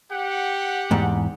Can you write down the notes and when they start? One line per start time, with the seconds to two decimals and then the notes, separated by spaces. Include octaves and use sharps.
0.12 G4 F#5
0.91 E2 G#2